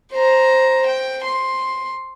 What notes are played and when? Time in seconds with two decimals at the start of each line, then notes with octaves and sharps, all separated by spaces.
0.12 C5 A#5
0.86 G5
1.24 C6